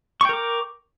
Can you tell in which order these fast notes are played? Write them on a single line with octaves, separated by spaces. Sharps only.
C#6 G5 A#4 D6